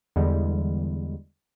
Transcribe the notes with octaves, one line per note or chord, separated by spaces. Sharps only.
E2 D3 E3 G3 G#3